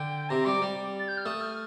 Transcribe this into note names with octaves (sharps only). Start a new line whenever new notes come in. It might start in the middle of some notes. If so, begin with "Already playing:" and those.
Already playing: D3 G5
C3 A#5
G3 D6
G3
A6
G6
F6
A3 D#6
F6